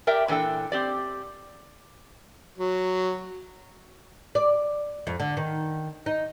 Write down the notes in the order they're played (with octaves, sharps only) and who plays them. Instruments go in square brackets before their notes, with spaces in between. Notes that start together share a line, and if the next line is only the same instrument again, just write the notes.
[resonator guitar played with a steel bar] G4 A#4 D5 E5 G5
A#2 E3 D4 A4 G5
C4 G4 D5
[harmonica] F#3
[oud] D5
F2
D3
D#3
D#4